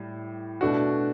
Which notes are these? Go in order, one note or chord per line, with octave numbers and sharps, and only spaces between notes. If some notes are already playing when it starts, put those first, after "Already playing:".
Already playing: A2 G3
B2 A3 D4 F#4